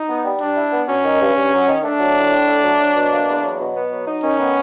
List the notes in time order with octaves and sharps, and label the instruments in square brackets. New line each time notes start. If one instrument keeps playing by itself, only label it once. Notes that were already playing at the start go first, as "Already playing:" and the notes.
Already playing: [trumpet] D#4
[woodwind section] B3
G3
[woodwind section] G3 [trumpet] D4
[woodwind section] E4
B3
[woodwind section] F#3 [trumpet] C#4
[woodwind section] D#3
G2
G2
F#3
D#3
[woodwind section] A3 [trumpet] D4
[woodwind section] F#3
A2
A2
A3
F#3
F#3
B2
A#3
E2
F#3
B2
B3
F#3
D#4
[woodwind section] D#3 [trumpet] C#4
[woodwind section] B3